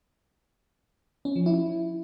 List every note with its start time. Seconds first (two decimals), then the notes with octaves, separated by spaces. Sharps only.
1.25 C#4
1.36 F3
1.46 E4